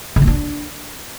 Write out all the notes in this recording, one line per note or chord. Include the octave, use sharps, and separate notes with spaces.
D3
A#3
D4